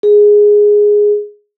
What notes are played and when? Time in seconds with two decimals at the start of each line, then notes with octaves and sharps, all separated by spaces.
0.03 G#4